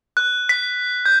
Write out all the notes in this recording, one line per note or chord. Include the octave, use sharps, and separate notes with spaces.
F#6
B6
G6